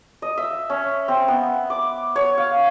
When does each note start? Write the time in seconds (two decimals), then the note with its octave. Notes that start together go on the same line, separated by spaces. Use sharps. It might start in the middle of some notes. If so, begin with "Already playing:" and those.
0.22 D#5
0.37 E5
0.70 C#4
1.08 C4
1.28 B3
1.70 D6
2.16 C#5
2.38 F5